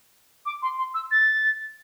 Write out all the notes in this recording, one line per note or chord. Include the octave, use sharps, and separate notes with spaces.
D6
C6
C6
E6
A6